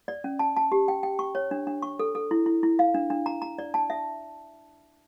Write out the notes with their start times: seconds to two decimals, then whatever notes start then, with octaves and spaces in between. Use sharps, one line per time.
0.08 D5
0.24 C#4
0.39 A5
0.57 A5
0.72 G4
0.88 G5
1.03 G5
1.19 C#6
1.35 C#5
1.51 D4
1.67 D4
1.82 C#6
1.99 A4
2.15 A4
2.31 E4
2.46 E4
2.63 E4
2.79 F5
2.94 D4
3.10 D4
3.26 A#5
3.42 A#5
3.59 D5
3.74 A5
3.90 E5